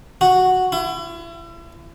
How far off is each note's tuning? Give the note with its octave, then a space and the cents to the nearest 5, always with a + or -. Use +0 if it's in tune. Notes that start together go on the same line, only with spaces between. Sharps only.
F#4 -5
E4 +35